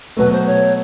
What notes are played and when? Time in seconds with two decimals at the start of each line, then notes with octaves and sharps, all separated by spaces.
0.17 B2 F#3 A3 B4
0.32 C5
0.46 C#5